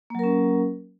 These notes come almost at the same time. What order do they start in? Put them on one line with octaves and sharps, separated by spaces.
A#3 F#3 A#4 C#4